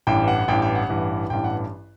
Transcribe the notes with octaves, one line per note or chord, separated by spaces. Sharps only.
A1 G2 E3 G5
F#5
A1 G2 E3 G5
G5
F#5
A1 G2 E3
A1 G2 E3 G5
F#5